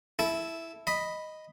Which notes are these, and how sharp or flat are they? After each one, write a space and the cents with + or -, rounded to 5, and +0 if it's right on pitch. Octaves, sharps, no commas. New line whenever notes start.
E4 +0 A4 -15
D#5 +0 B5 +0